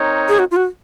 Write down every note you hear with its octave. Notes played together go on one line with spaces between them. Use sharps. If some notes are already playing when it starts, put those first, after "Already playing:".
Already playing: C4 D#4 A#4 C#5
G#4
F#4
F4
F#4